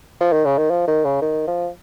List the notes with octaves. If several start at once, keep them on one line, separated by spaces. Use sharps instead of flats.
F3
D#3
C#3
D#3
F3
D#3
C#3
D#3
F3